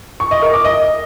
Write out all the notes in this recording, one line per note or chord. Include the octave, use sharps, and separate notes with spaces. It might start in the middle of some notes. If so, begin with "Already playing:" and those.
C#6
D#5
A#4
D6
D#5